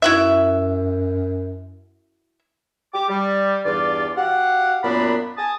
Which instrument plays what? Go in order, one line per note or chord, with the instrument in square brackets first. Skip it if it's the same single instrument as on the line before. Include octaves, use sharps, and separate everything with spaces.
[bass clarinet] F#2 [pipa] E4 F#4 E5
[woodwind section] G4 D6
G3
E2 G2 E3 F4 D5
F#4 G4 F5 F#5
F#2 A#2 B3 D4 B5
G#5 A5 D#6